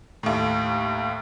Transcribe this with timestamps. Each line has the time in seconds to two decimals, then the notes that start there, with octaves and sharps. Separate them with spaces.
0.23 D#2 A2